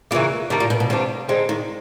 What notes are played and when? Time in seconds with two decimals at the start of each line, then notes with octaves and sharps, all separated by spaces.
0.11 A#2 G3 A#3
0.15 C#3 E3
0.50 B2 D#3 G3 A#3 D4
0.60 A#2
0.70 B2
0.80 B2
0.90 C3 D#3 G3 A#3 D4
1.29 D3 G#3 C4 D#4
1.49 D#3